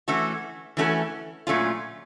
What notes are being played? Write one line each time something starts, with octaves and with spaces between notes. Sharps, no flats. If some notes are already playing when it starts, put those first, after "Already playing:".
E3 A3 C#4 F#4 A4
E3 A3 C#4 F#4 A4
A#2 F#3 A3 C#4 F4